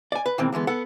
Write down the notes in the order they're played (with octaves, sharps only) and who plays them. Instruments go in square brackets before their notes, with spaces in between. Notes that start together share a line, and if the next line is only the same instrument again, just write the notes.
[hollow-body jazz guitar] D5 G#5
B4
B2 D#3 E3 G#3 A#3 C4
D3 E3 G#3 B3
B3 A4 F#5